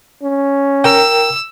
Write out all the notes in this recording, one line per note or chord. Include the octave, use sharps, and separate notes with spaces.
C#4
A#4 G5 E6